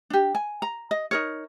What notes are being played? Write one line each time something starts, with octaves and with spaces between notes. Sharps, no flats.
D4 G4
G#5
A#5
D#5
D#4 A#4 C#5